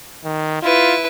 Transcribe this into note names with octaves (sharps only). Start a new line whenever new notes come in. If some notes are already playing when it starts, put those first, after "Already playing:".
D#3
E4 F4 B4